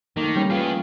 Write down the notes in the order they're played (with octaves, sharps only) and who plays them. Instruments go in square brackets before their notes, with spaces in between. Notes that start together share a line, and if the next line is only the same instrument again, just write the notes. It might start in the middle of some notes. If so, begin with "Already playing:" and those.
[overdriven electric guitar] D#3 [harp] A3 A#3
[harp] G3 C#4
[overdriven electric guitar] B3 G#4 [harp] F4